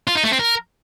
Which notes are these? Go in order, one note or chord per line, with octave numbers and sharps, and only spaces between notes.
F4
D#4
A3
C4
A#4